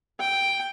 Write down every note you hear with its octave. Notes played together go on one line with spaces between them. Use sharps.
G5